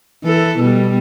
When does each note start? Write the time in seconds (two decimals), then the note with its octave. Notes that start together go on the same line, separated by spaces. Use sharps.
0.24 E3 A4
0.59 B2 G3